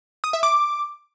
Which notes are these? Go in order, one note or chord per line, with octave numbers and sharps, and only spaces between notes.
D#6
E5
D6